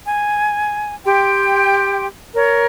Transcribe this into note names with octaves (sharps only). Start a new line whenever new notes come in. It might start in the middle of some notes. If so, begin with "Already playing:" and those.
G#5
G4 G5 C6
A#4 C#5